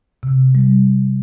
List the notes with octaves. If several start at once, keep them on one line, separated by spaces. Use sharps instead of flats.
C3
G3